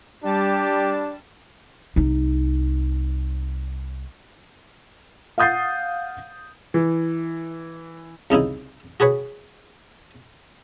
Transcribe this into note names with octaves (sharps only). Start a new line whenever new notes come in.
G3 D4 G4 A5
C2 D#4
F5 F#5 D#6 G6 A6 C7
E3
C2 C#3 D#4 E4
F#4 G#4 B4 C#5